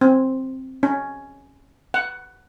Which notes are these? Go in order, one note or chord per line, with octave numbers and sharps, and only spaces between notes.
C4
C#4
F#5